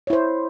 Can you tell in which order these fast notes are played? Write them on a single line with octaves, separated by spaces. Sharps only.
C#5 E4 C5